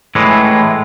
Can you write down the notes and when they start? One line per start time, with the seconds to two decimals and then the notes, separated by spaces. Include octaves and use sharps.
0.15 A2 E3 G#3